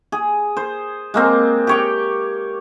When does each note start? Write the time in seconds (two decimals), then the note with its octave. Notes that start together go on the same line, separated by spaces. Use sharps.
0.12 G#4
0.57 C5
1.14 G#3 A#3 C4
1.67 G4 C#5 G5